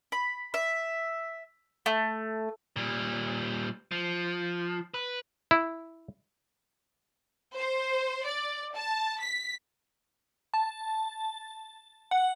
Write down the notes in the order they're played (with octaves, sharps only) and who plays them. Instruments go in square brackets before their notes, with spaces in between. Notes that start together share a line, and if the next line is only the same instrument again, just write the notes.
[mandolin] B5
E5
A3
[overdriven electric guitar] A#2 G3
F3
B4
[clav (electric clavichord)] E4
[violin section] C5
D5
A5
B6
[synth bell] A5
F#5